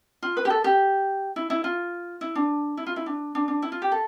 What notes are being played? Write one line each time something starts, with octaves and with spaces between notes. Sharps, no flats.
F4
B4
G4
A4
G4
E4
E4
F4
E4
D4
E4
F4
E4
D4
D4
D4
E4
F4
G4
A4